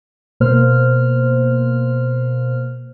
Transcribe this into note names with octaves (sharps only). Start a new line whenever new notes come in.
B2 A#3 C5 F6